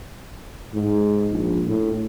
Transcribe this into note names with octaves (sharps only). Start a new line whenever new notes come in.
G#2
A#1
A2